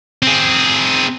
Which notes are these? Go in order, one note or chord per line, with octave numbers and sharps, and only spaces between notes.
C4 G#4